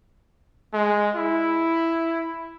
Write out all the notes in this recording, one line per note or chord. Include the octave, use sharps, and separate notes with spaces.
G#3
E4